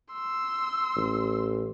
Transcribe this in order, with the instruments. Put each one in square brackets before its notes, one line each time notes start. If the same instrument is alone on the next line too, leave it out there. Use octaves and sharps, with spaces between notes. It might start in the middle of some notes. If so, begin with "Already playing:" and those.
[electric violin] C6 E6
[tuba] A1